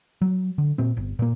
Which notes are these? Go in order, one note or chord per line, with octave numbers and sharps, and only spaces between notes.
F#3
D3
A#2 C4
G1
A#2 A#3